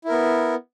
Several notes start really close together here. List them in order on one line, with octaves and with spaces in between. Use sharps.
E4 A#4 B3